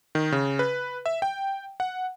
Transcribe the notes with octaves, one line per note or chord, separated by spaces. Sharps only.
D#3
C#3
B4
E5
G5
F#5